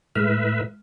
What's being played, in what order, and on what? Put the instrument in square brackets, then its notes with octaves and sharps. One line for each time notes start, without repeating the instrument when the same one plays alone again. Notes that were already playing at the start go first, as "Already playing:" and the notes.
[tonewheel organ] A2 B4 E5 [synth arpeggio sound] G#3 F6